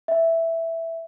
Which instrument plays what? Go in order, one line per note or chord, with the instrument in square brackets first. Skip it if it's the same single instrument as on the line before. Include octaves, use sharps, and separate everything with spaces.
[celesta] E5